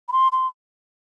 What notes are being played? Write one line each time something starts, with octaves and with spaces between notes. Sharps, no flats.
B5
C6
C6